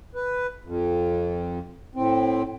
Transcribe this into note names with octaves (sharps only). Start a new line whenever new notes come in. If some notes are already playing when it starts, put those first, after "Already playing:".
B4
F2
A2 C4